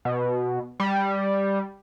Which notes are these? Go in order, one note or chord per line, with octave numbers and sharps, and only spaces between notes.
B2
G3